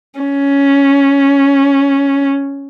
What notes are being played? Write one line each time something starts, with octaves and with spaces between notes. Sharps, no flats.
C#4